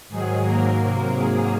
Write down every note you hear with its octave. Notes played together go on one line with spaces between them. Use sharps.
G#2 D#3 F#3 G#4
G#2 F#3 A#3 A#4
C3 F#3 A#3
G#2 F#3 A#3 G#4